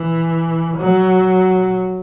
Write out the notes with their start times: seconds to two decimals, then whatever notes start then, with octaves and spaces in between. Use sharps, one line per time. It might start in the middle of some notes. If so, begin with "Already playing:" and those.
Already playing: E3
0.77 F#3